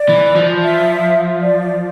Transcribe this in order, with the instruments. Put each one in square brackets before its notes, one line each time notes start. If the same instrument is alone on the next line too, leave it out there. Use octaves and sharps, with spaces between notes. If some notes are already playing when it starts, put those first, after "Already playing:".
Already playing: [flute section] D5
[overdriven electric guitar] E3
F3
[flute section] E5
D5